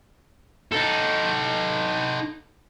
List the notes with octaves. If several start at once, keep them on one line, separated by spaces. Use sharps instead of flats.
D#4 A4